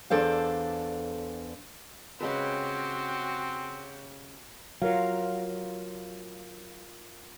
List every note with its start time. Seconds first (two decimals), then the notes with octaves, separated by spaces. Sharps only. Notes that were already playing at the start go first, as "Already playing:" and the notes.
0.10 E2 D4 A4 C5 F5
2.20 C#3 G#3 C4 F#4 G4 B4
4.82 F#3 F4 A#4 F5